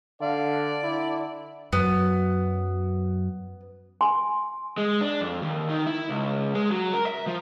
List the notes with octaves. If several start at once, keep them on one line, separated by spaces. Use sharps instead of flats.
D3 D5 F5
D3 E4
F#2 F#3 B3
G#5 C6
G#3
D4
F2
D#2
D#3
E4
C#2
G#3
F#3
A#4
E5
F3